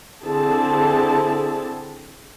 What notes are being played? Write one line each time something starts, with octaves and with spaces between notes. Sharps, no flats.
D3 C4 E4 G#4 A5